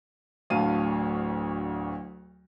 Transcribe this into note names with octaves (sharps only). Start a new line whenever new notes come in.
D1 D2 F5 A5 D#7